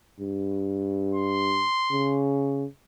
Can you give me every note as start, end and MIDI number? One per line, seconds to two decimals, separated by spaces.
0.20 1.64 43
1.15 2.22 84
1.91 2.65 49